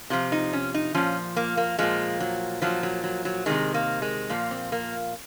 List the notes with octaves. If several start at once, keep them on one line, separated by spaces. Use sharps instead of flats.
C3 F3 F4
D#4
C#4
D#4
A#2 F3 C#4
A#3
A#3
A#2 F3 G#3
F#3
A#2 F3 F#3
F#3
F#3
F#3
C3 D#3 G#3
A#3
G#3
A#2 F3 A#3
C4
A#3